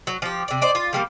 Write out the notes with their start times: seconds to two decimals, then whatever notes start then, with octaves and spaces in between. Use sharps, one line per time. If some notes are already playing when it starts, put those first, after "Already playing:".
0.07 F#3
0.22 F3 G4
0.48 C3 D5
0.61 C5 D5 D#5
0.75 F4
0.93 F3 G3 A#3